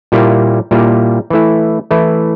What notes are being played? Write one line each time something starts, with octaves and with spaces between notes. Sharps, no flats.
A#2 G3 A#3 E4
A#2 G3 A#3 E4
E3 A3 E4
E3 A3 E4